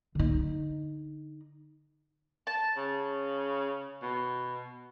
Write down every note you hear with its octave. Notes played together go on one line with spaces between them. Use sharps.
D3 D#4
A5
C#3
B2